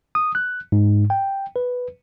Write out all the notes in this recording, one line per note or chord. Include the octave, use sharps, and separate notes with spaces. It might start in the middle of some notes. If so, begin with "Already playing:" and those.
D#6
F#6
G#2
G5
B4